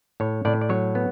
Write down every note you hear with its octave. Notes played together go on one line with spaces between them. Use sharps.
A2 C#5
A2 D5
D5
F#3 C#5
B3